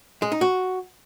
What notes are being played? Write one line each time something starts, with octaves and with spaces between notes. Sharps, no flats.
G#3
D#4
F#4